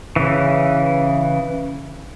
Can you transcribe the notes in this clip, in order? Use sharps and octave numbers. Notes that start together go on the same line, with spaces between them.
C#3 E3